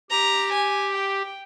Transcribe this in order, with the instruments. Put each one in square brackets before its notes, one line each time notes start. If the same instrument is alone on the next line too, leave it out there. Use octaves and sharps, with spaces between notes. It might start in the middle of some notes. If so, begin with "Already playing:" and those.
[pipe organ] G4 [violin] A#5
[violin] G#5
G5